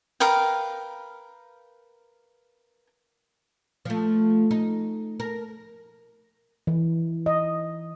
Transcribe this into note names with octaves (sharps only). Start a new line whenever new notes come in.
A#4 B4 F5 G5
F3 A3
D#4
A#4
E3
D#5